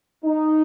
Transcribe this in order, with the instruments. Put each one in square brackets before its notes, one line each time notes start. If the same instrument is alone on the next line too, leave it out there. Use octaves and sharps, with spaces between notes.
[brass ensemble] D#4